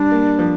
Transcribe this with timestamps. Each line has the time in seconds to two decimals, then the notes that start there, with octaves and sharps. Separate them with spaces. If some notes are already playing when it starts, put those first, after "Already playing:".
Already playing: G3 D4
0.12 A#3
0.39 F3